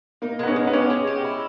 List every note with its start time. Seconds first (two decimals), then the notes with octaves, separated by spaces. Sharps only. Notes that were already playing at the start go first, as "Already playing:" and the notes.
0.22 A#3 D#4
0.39 G#3 B3
0.48 C#4
0.56 G#3
0.67 B3
0.73 C#4 G4
0.90 G#3
1.07 G4
1.24 E4